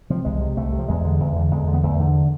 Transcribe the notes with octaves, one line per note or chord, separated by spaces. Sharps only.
C3 F3
C2 G#3
C3
C2 A3
C3
F3
E2 G#3
D3
E2
D3
E2 G#3
D3
B3
E2 A3
D3